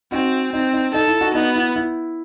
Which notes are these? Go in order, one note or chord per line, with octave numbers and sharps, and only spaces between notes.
C4 D#4 F#4
C4 D#4
D#4
D#4 A4
E4
D#4 F#4
B3 D#4 F#4
E4
E4